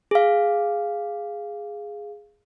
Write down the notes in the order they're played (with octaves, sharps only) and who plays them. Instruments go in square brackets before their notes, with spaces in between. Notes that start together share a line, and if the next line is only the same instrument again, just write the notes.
[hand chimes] G#4 F5